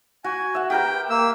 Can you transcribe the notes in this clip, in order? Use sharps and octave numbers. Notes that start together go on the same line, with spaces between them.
F#4 G#5
E5 F#5
G4 A#4 B4 G5
A#3 E6